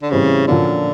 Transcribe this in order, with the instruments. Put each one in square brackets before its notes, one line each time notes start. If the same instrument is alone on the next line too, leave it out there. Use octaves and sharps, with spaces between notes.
[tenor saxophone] D3
[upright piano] A2 E3 G3 C4 [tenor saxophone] C#3
[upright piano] A#2 F3 A#3 C#4 F#4 [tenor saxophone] D3